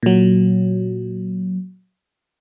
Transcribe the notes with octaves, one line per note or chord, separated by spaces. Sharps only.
A#2 F#3